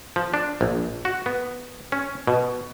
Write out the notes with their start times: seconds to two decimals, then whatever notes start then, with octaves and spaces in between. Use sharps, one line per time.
0.16 F3
0.34 D4
0.61 A#1
1.05 F#4
1.26 B3
1.92 C#4
2.27 B2